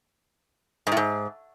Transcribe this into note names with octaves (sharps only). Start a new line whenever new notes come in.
G#2
A2
G#2